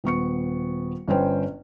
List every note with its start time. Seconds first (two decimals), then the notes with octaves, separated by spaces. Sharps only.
0.04 D#1 B3 C#6 C#7
1.08 G1 C#4 B4 C5 G5